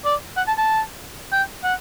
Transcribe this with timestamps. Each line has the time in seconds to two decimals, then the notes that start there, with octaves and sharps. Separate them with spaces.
0.05 D5
0.37 F#5
0.47 A5
0.58 A5
1.32 G5
1.64 F#5